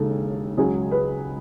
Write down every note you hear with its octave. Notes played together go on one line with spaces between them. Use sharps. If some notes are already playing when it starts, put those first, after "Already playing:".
Already playing: E1 D#2 C#3 A4
C#2 C#3 F#3 G#4
B4